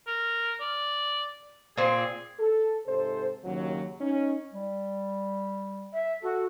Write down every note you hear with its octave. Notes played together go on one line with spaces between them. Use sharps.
A#4
D5
A#2 C4 G#4
A4
G#2 C3 A4 C5
D#2 C#3 F#3
C#4 D#4
G3
E5
F#4 A4